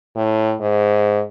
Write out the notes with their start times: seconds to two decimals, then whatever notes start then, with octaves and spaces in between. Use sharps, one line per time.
0.16 A2
0.61 G#2